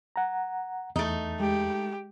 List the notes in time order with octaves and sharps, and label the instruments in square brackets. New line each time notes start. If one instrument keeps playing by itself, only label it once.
[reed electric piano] F#5 A#5
[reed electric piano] E2 [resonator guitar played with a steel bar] A3 D#4
[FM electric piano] G#3 [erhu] G4